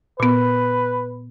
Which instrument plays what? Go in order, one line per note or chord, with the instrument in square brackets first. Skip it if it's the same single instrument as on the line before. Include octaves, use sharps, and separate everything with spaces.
[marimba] A#2 B3 [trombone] B4